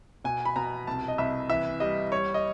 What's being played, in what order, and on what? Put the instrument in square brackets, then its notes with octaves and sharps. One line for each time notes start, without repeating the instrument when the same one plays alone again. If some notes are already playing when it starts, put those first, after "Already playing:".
[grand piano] B2 G#5
B5
B2 A#5
C2 A5
D#5
C2 E5
E3 E5
G3 D#5
G3 C#5
D#5